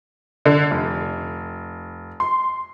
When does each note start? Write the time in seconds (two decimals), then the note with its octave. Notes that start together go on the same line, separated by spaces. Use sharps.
0.45 D3
0.71 F1
2.20 C6